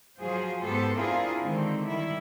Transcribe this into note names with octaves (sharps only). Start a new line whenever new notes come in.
F3 F#3 F4 G#4 C5
G#2 B3 G4 A4 C5
C4 D4 E4 F4 G#4 A#4
D3 D#3 G#3 C4
D#3 G3 E4